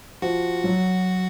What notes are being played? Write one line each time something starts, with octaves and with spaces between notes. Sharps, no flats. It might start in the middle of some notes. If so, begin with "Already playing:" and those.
F3 F#4
F#3